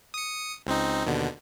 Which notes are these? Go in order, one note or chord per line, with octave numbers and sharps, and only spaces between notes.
D#6 C#7
C#2 C4 D#4
D#2 B2 D3